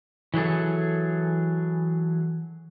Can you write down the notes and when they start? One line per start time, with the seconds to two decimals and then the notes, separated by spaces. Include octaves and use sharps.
0.34 E3 F#3 G#4 A4